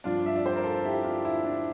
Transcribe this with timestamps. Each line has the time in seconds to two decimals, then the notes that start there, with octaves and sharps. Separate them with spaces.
0.04 G2 F3 D4 F4
0.26 E5
0.36 D5
0.46 C5
0.56 A#4
0.64 F4 A4
0.85 E4 G4
1.04 D4 F4
1.25 E4
1.45 D4